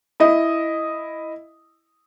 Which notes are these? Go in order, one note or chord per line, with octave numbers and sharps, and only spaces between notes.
E4 D#5